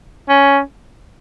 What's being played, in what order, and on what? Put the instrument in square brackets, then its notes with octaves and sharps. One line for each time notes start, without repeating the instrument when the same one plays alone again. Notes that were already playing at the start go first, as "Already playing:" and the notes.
[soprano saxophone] C#4